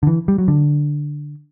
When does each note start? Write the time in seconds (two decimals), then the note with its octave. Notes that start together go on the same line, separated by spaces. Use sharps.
0.03 D3
0.07 E3
0.28 G3
0.38 F#3
0.48 D3